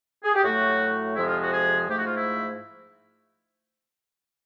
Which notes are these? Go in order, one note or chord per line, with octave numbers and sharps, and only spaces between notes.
G#4
G4
A2 F#3 A3 F#4
F2 C3 F3 G#3 E4
F4
F#4
G#4
G#2 F3 A3 G4
F#4
F4
E4